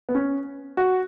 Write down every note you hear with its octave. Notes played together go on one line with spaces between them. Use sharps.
B3
C#4
F#4